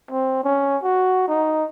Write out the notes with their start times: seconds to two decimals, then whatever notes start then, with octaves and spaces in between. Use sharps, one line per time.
0.11 C4
0.44 C#4
0.83 F#4
1.28 D#4